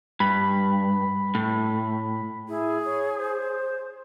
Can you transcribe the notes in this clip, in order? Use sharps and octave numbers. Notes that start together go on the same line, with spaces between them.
G2 B5
A2
E4 G#4
C#5
C5